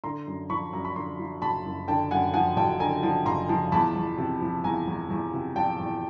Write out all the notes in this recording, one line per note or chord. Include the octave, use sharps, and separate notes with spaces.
D3 A#5 C6
F#2
F3 B5 C#6
F#2 A#5
B5
D3 A#5 C6
F3
F#1 A5 B5
F#2
D3 G5 A5
F#2 F#5 G#5
F3 F#5 G#5
F#1 G5 A5
D3 G#5 A#5
F3
F#1 A#5 C6
F3
E2 A5 B5
E2
C3
F3
E2 G#5 A#5
E2
E2
C3
F3 G5 A5
E2